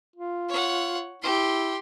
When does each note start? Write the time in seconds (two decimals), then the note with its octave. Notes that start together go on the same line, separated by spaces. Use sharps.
0.16 F4
0.49 C#5 F#5
1.22 E4 G4 C6